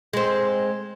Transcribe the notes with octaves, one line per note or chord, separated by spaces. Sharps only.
G#3 C4